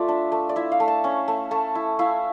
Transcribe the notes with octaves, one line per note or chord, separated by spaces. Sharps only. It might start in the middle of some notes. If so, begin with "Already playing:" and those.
Already playing: A3 F4 D5 E5
D4
A3
D5
E4 E5
F5
A3
A5
C#4
A3
A3 A5
E4
E4 F5